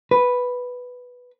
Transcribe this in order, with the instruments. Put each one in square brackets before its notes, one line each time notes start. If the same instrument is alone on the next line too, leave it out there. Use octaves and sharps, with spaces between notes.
[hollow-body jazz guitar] B4